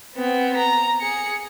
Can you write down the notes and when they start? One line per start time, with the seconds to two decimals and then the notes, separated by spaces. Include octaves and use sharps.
0.16 B3 C4
0.57 A#5
1.02 G#4 C#7